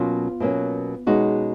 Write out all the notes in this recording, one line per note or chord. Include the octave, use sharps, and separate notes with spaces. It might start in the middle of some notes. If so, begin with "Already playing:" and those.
Already playing: B2 F#3 A#3 C#4 F4
B2 F#3 A#3 C#4
B2 G#3 C#4 D#4 F#4